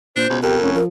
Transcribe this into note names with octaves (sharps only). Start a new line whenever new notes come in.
A#2 D4 C5
C#2 B2
F2 G4 A#4
F1 C#4
F3 A#4